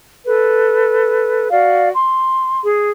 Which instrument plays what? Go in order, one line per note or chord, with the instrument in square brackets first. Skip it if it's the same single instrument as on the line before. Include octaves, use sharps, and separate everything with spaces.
[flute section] A4 B4
F#4 D5 F5
C6
G#4